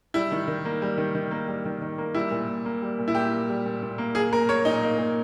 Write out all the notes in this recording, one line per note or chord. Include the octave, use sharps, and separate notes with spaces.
G3 E4
D#3
D#3
A#3
G3
D#3
D#3
A#3
G3
D#3
D#3
A#3
G3 E4
A#2
A#2
A#3
G3
A#2
E4
A#2 G4
A#3
G3
A#2
A#2
A#3
A#3 G#4
A#2 A#4
A#3 C#5
A#2 D#4
A#3
A#2